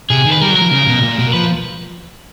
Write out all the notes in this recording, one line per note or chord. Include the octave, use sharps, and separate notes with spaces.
C3 G#4
D#3
B4
G3 A#4
F#3
A#4
F3
C#3
B2
A#2
B2
F3 B4